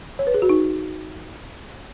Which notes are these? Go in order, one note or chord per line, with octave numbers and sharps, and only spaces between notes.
C#5
B4
G#4
F#4
D#4